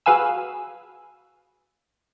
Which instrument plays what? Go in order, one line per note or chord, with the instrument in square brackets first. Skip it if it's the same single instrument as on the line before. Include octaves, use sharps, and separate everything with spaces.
[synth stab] F#4 G#4 B4 F5 G#5 E6